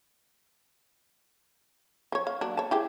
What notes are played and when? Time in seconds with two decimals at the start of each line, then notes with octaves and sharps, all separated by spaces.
2.12 F3 C#5
2.27 F5
2.41 F#3 A#3 D4
2.57 C#5 A5
2.71 E4 G4 G#4